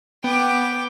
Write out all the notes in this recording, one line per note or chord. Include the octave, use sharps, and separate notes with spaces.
B3 G5 D6